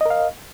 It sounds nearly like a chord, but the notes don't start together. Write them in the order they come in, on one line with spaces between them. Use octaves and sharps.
D#5 A#4 F5